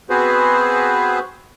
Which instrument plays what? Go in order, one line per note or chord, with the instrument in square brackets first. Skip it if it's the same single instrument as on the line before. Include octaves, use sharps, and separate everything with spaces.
[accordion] B3 C4 F#4 G#4 B4 C5